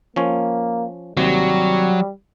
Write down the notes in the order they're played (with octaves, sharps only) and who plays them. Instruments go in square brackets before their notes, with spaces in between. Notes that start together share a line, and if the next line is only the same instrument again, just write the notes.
[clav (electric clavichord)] F3 C#4 C#5 [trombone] A#3
[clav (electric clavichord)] D#2 C3 [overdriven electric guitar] F#3 [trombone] G3